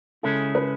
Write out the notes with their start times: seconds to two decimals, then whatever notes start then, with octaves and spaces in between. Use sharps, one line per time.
0.23 C#3 G#3 C#4 E4 G#4 A4
0.55 B4